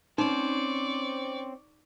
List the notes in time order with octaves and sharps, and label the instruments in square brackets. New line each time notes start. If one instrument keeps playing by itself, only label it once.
[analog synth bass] C4 [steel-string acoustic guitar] C#4 C5 [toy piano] D#4 B5 [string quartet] D5 C#6